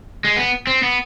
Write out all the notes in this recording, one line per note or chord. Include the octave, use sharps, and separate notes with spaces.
G#3
B3
C4
B3